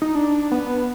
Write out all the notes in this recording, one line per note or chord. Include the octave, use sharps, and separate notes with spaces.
D#4
D4
B3